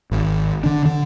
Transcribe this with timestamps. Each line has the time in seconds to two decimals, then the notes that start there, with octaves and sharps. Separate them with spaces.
0.11 G#1
0.64 D3 D4
0.85 D3